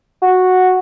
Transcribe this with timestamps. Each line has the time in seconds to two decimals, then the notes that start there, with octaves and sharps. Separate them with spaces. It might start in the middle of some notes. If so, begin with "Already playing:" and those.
0.22 F#4